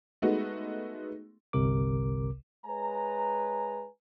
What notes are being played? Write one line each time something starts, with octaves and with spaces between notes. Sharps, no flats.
G#3 A3 B3 D#4 F#4
G1 C2 C3 A#4 D6
G#3 B4 C#5 G#5 A#5